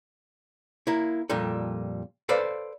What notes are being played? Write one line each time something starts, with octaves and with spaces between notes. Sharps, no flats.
A#3 E4
F2 A#2 G3 A4
A4 B4 C5 D5 F5